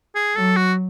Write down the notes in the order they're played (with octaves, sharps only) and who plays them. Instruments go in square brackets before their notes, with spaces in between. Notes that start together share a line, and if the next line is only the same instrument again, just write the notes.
[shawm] G#4
[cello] F#3 [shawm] A4
[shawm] F#4